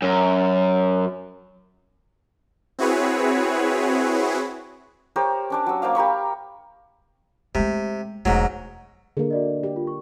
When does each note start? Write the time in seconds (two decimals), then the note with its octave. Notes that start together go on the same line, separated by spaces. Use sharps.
0.02 F#2
2.79 C4 E4 F#4 G#4 B4 C#5
5.16 G4 A#4 C5 C#5
5.50 C#4 D4 D5
5.66 F#3 E6
5.82 A#3 C5 D5 F5
5.95 G4 A#4 B5 C#6
7.55 C3 G#3 A3
8.25 E1 G#2 F#3 A3
9.17 D3 A#3 G#4
9.31 F#4 D5 D#5
9.63 G4
9.76 F4
9.87 C#6